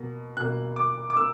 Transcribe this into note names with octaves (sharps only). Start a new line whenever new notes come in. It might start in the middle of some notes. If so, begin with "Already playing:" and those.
Already playing: B2 A#3
B2 A#3 F#6
D6
D6
A#3 E6